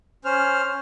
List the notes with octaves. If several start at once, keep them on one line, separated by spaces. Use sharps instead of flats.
C#4 C5 F6